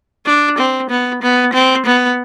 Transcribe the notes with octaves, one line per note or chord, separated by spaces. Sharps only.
D4
C4
B3
B3
C4
B3